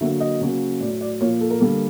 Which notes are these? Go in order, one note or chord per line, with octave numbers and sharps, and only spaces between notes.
D3 F#3 A#3 E5
D#5
C#3 F#3 A#3
A2 F#3 A3 D5
D5
A#2 F3 A#3 C#5
A4
A#4
D3 G3 A#3 A4